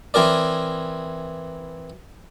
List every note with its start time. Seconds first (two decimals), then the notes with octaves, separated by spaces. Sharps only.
0.14 E3 C4 G#4 A#4 D5